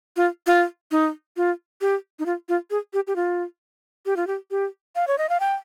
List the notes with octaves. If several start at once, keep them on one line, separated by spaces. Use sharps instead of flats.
F4
F4
D#4
F4
G4
D#4
F4
F4
G#4
G4
G4
F4
G4
F4
G4
G4
F5
C#5
D#5
F5
G5